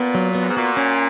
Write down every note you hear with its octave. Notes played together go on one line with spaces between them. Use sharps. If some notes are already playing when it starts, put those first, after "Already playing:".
Already playing: A#2 B3
F#3
B3
F#2
G#2
A#2 F#4
C#4